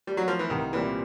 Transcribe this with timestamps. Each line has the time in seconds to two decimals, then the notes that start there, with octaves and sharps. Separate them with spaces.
0.07 G3
0.17 F#3
0.28 F3
0.39 E3
0.50 C2 D#3
0.73 A#2 E3 G3 C4